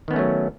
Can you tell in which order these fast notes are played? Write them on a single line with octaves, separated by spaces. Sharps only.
D#3 B3 C#4 A3 F#3